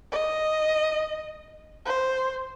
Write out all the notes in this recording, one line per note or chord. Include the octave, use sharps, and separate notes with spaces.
D#5
C5